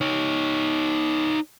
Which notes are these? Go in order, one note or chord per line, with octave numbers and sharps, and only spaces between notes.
D#4 C#5